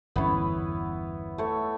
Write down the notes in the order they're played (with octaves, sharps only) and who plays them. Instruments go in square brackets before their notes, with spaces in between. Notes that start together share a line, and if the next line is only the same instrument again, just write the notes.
[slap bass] G1 E2 C#4 [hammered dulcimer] B3 E4 C#5
[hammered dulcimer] A3 C#5